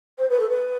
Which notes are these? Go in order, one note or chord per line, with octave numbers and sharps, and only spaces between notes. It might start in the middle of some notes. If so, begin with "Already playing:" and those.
C5
B4
A4
B4